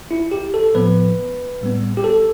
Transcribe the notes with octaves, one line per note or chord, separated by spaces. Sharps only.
E4
G4
A4
A2 F3 B3 B4
A2 G3 B3
G4
A4